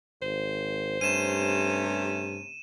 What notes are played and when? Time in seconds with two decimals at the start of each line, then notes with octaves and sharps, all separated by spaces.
0.22 G#1 C5
1.01 G2 C3 A3 C#4 D#7 E7